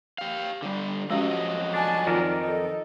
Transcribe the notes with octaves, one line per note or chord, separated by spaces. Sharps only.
G4 F5
D3 G3
F3 F#3 G#3 C#4 F#4 G4 D#5
D4 G#5 A5
F2 D#3 F4 A#4 D5
D#4 A4